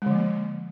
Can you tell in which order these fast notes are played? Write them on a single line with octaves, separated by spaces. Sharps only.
G#3 D3 F3 A#3